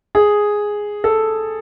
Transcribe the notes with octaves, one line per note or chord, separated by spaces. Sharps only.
G#4
A4